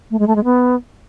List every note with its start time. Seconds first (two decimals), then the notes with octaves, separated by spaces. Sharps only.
0.11 A3
0.19 G#3
0.27 A3
0.36 G#3
0.44 B3